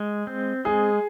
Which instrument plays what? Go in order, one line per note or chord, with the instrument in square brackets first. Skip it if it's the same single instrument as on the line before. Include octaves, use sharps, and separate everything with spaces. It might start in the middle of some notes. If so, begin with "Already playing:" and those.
Already playing: [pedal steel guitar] G#3
C4
[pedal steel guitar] G#3 [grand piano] G#4